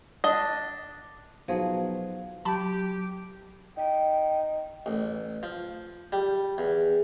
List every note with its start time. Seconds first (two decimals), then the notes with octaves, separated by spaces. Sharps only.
0.24 D4 D#5
1.48 B1 F3 F#4 G#4
2.45 F#3 G4 A5 B5
3.77 D#4 G5
4.86 A1
5.43 F3
6.13 G3
6.58 E2